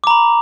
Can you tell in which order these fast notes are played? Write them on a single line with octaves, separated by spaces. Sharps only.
D6 A#5 B5